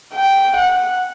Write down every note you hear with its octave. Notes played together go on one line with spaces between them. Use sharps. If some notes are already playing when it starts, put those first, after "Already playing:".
G5
F#5